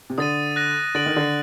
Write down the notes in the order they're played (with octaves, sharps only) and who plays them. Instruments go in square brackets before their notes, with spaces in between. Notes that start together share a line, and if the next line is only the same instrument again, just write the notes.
[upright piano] C3
[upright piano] D3 [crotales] D#6 A6 D#7
[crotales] F#6 A#6 D#7
[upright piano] D3 [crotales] A6 D7 F#7
[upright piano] D#3
D3